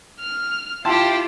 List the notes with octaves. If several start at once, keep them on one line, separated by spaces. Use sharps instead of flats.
F6
E4 F4 G4 G5 A5 C6